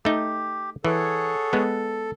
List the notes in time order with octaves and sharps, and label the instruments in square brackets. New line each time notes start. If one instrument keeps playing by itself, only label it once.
[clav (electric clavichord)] A3 D#4 [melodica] G4
[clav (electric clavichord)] E3 [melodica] G#4 C#5 F#5 [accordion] A4
[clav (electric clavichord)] G#3 B3